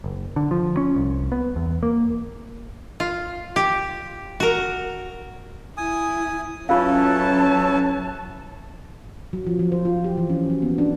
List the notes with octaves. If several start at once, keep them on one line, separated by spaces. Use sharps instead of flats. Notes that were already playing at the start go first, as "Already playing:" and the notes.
F#1
D3
F3
C#4
C2
B3
E2
A#3
F4
G4
F#4 A#4
E4 G#5 D#6
F#3 C#4 E4 F4 A4 B4 F5 A5
F#3
F3
F3
C5
F4
G4
E3
C#4
F#3
B3
D4